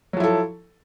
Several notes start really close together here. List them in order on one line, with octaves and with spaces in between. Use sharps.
F#3 F3 E4 A4